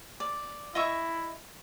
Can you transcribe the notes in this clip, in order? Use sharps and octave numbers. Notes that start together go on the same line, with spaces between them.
D5
E4 D#5 E5 C#6